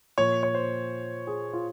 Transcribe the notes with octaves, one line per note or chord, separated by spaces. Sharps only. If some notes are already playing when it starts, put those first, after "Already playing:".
A#2 F3 C#5
C#5
C5
G#4
F4